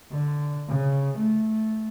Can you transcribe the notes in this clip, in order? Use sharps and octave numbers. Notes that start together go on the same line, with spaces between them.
D3
C#3
A3